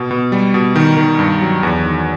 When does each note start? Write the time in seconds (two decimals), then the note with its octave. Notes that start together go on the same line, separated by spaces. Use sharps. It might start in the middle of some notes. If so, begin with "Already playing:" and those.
Already playing: B2
0.11 B2
0.32 G3
0.54 B2
0.76 D#3
0.97 D#3
1.19 G2
1.41 F#3
1.63 E2
1.85 D#3